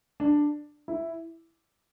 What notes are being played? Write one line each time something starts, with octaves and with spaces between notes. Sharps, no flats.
D4
E4